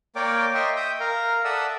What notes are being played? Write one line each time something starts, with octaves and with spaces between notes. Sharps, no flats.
A#3 A#4 C#5 D5 G5 D6
D#5 E5 G5 C6 C#6
E5 G5 D#6 G6
A#4 F5 A#5
A4 D5 E5 F#5 D#6 E6